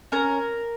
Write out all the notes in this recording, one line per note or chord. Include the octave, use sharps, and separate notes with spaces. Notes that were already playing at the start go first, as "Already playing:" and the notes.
C#4 A#4 A#5